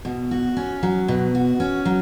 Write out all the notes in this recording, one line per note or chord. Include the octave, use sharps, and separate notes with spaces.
B2
F#4
C#4
F#3
B2
F#4
C#4
F#3